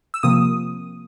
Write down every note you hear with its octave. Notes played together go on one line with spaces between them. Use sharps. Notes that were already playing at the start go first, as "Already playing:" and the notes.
E6
C3 F3 A#3 D#6